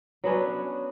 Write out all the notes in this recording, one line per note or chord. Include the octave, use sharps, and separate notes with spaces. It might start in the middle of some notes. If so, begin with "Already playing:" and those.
F#3 B3 C#4 D4